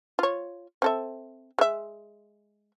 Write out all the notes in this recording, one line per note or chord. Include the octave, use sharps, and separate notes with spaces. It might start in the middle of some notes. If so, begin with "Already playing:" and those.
F4 C#5
C4 A4 E5
G#3 E5